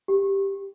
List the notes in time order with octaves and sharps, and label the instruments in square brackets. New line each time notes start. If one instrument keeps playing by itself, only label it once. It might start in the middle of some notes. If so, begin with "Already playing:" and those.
[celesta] G4